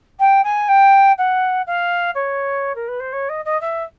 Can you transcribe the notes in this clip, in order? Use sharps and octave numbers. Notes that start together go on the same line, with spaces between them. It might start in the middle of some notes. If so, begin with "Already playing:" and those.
G5
G#5
G5
F#5
F5
C#5
A#4
B4
C5
C#5
D#5
D#5
E5